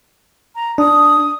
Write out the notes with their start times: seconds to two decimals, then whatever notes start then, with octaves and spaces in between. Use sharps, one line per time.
0.55 A#5
0.78 D4 D#6